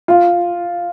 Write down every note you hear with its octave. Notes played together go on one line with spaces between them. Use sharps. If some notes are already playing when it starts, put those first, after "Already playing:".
F4